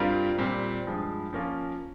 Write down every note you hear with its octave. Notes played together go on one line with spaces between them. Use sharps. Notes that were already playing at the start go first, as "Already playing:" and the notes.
Already playing: G2 G3 C4 F4 A#4
A#2 G3 C4
G2 F3 G#3
F3 A#3 C#4 F4 A#4